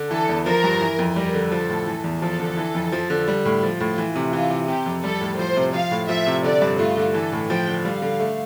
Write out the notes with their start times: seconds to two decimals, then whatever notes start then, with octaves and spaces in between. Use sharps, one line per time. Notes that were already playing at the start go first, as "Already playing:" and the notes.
Already playing: D3
0.10 E3 A4
0.29 E2
0.46 F3 A#4
0.64 G2
0.81 E3
0.99 F2
1.16 G3 A#4
1.34 D3
1.51 F3 A4
1.69 A2
1.87 E3
2.04 E2
2.22 F3 A4
2.39 D3
2.57 E3
2.75 F2
2.92 F3
3.10 D3
3.28 G3
3.45 A2
3.63 F3 F4
3.80 A2
3.98 E3
4.16 C3
4.33 E3 F4
4.50 C3
4.68 C3 G4
4.86 F2
5.04 G3 A4
5.21 A2
5.39 F3 C5
5.57 C3
5.74 F3 F5
5.91 A2
6.09 F3 E5
6.27 C3
6.44 D3 D5
6.62 G2
6.79 A3 F4
6.97 D3
7.14 E3 A4
7.32 A2
7.50 F3 G5
7.67 D3
7.84 G3 F5
8.02 D3
8.20 A3